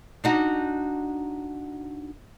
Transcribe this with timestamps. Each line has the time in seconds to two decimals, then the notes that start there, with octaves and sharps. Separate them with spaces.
0.24 D4 D#4 F#4